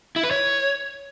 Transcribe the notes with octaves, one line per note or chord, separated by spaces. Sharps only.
E4
B4
C#5